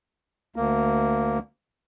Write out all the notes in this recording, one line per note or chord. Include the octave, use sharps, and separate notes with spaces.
D2 A#3